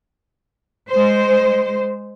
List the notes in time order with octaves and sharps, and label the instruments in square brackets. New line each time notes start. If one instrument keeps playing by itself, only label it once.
[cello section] G#3 C5